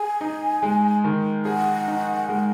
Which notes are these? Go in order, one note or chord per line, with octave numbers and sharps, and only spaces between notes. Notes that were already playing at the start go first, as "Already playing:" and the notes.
Already playing: G#4 G#5
D#4
G#3
D#3
G#4 F#5
D#4
G#3